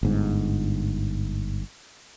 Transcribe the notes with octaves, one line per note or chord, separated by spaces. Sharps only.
G1 G#2